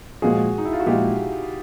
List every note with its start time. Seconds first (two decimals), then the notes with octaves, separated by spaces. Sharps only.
0.22 A#2 F3 G#3 F#4 G#4
0.58 D#4
0.65 E4
0.73 F4
0.80 F#4
0.86 A#2 F3 G#3 F4 G4